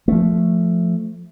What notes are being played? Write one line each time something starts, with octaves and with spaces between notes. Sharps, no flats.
F3 A3